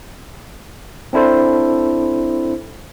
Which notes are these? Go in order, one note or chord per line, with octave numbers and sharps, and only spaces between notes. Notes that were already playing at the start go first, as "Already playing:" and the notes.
C4 D4 E4 A4 C5